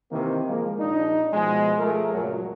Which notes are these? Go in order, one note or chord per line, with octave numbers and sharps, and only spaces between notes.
C3 D#3 E3 A#3 C4
F3 G#3 A#3
A#1 D4 D#4
B2 F3 G#3
F3 A3 G#4 A#4
C#2 F#2 A#2 F#3